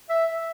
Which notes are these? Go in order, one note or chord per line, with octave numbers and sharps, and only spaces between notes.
E5